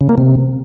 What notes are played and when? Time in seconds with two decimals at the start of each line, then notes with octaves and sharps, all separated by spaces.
0.01 C#3
0.09 A#3
0.18 C3